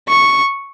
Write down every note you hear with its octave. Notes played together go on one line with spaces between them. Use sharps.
C#6